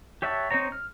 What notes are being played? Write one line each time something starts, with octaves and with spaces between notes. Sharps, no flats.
G4 C#5 E5 F#5 A5
C4 D#4 C5 C#5 A#5
F6